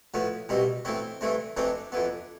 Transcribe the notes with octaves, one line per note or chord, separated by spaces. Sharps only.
A2 F3 B3
C2 B2 G3 C4
A2 E3 B3 C4
G2 E3 A3 C4
F2 E3 A3 C4 D4
F2 E3 B3